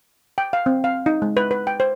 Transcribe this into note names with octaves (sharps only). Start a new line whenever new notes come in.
G5
F5
C4
F5
D#4
G#3
B4
B4
G5
C5